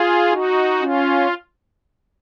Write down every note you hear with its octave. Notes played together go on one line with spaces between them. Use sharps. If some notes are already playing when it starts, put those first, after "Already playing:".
Already playing: F4 G#4
D#4 F#4
C#4 F4